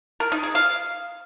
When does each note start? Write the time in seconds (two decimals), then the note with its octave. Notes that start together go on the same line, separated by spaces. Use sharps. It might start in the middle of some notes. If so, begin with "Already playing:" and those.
0.20 A#4
0.32 D#4
0.43 G#4
0.55 F5